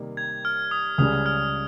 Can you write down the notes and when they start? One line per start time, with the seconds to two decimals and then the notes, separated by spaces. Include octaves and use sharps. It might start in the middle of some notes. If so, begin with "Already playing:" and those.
Already playing: C3 D#3 G3 A#3
0.17 G#6
0.45 F6
0.71 D#6
0.98 C#2 C#3 G3 D#6
1.26 F6